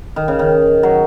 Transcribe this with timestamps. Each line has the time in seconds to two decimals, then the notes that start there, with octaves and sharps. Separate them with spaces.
0.16 D#3
0.28 C#3
0.39 D#3
0.83 F#3